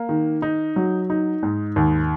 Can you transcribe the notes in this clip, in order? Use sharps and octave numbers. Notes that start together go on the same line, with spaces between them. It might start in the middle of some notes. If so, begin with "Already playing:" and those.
Already playing: A#3
D#3
D#4
F#3
D#4
G#2
D#2